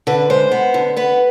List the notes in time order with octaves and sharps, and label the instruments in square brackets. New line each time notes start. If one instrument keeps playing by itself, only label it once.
[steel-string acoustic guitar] D3 B4
G#3 C5
B3
D3
B3 B4